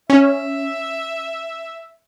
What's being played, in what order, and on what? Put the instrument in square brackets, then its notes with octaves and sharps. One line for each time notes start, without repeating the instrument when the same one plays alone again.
[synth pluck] C#4 [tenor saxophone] E5